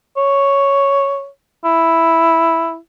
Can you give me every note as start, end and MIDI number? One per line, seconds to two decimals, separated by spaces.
0.17 1.28 73
1.65 2.77 64